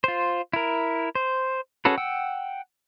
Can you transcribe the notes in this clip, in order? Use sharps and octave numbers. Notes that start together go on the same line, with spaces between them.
F4 C5
E4 A#4
C5
C#4 F#4 G#4 A4 B4
F#5 G5 E6